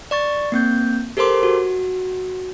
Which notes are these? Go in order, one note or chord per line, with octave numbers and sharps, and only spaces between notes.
D5 C#6 A6
A#3 C4 G6
G4 A4 A#4 C5 C6 D6
F#4